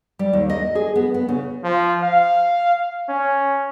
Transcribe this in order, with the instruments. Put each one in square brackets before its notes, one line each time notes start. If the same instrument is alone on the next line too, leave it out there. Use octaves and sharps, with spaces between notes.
[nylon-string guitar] G3
D#2
D#5
G#4
B3
B3
C#3
[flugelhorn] F3
F5
C#4